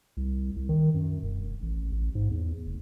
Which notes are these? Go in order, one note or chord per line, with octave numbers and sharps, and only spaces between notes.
C2
C2
D#3
F#2
E1
A1
A1
G#2
E2
F1